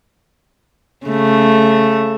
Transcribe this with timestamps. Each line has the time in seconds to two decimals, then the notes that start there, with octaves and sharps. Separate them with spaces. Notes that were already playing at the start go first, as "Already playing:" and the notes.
1.06 C#3 A3